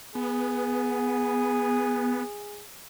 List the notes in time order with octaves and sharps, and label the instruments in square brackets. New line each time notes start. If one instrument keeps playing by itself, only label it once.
[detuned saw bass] B3 [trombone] G#4